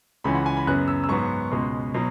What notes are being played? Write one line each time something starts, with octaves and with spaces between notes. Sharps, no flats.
C#2 C#3 E3 C#4 B5
F#5
G#5
B5
F#2 C#3 F#3 B3 F#6
E6
E6
G#2 F#3 B3 C#6
C#2 B2 G#3
B2 F#3